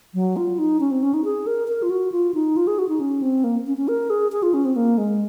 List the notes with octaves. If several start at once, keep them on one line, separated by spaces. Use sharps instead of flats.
F#3
F4
D#4
C#4
C4
C#4
D#4
G#4
A#4
A#4
F4
F#4
F4
D#4
F4
G#4
F#4
D#4
C#4
C4
A#3
C#4
C#4
A#4
G#4
G#4
F4
C#4
C4
A#3
G#3